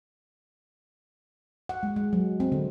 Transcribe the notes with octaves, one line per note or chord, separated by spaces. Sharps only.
F#5
G#3
G#3
F#3
C4
D3